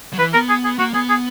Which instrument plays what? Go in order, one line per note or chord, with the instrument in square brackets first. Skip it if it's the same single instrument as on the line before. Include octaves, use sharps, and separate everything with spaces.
[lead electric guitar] F#3
[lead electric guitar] E3 [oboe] B4
[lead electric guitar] B3 [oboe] A#4
[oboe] G#4
G#4
[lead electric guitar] A#3 [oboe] F#4
[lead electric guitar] B3 [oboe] G#4
[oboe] G#4